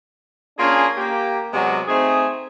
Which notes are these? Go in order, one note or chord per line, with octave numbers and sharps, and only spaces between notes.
A#3 C#4 D4 F4 G#4
A#3 G4
C3 F#3 G#3 B3 D4 F#4
A3 C4 D#4 G#4